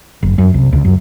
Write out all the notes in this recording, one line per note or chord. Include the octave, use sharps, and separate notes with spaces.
F#1
F#2
C2
C#2
F#2